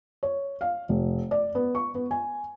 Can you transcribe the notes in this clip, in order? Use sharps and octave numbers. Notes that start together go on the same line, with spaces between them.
C#5
F5
F1
D5
B3
C#6
B3
G#5